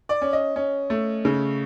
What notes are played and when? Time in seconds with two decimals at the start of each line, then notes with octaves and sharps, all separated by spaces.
0.09 D5
0.22 C#4
0.33 D#5
0.56 C#4
0.90 A3
1.25 C#3